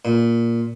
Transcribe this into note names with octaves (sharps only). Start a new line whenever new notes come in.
A#2